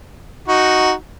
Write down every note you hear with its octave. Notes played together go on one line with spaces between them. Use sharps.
D#4 F#4